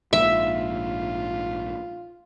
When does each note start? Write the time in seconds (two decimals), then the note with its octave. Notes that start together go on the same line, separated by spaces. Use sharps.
0.13 A#1 G#2 F4 E5